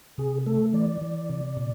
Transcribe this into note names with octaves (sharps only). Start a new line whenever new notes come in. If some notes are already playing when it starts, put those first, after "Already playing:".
C3 G#4
A3 A4
E3 D5
E3
C3
A#2